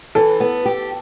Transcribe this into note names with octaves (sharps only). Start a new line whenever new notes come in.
E3 A4
B3
G4